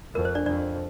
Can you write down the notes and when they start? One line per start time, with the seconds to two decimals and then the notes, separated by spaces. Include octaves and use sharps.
0.15 F2 A#4
0.25 C5
0.35 D4 D5
0.46 F2 D4 D5